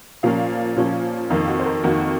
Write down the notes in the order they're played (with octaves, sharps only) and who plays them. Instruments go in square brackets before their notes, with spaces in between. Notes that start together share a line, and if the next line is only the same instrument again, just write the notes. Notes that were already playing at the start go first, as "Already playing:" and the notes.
[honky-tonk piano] A#2 F3 A#3 C#4 F5
A#2 F3 A#3 C#4
F2 D#3 A#3 F5
F#4
C5
A#4
F2 D#3 A#3 F#4